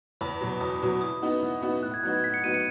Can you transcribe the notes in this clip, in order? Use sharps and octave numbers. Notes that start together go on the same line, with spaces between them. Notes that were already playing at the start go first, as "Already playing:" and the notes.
E2 B5
B2 F#3
E2 D#6
B2 F#3
E3 D#6
B3 D#4 F#4
E3
B3 D#4 F#4
A2 F#6
G#6
F#3 B3 D#4 F#4 F#6
G#6
A2 B6
C#7
F#3 B3 D#4 F#4 D#7
C#7